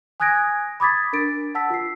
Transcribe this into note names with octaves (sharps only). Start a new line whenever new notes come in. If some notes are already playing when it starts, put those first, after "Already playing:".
G#5 D#6 F#6 G#6 A#6 D7
B5 D6 D#6 G#6 A6 B6
D4 A#4 A6 D7
F#5 A5 E6 B6
F4 C7